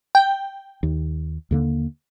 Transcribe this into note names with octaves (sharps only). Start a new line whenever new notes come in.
G5
D#2
D#2 D3 A#3